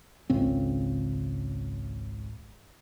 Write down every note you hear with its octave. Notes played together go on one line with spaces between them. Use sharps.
G#1 C#2 C#3 C4